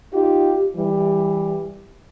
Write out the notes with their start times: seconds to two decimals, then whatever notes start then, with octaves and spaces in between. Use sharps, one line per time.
0.14 D#4 F4 G4
0.76 E3 G3